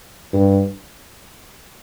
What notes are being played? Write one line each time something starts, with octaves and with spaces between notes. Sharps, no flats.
G2